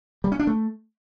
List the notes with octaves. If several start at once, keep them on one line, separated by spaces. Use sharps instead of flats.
G3
C#4
D4
A3